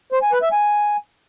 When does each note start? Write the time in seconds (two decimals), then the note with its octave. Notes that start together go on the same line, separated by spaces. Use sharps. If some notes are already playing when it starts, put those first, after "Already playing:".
0.12 C5
0.22 G#5
0.32 B4
0.42 E5
0.52 G#5